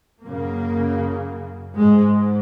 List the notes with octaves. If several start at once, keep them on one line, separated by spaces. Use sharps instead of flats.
F#2 C#3 A#3
G#2 G#3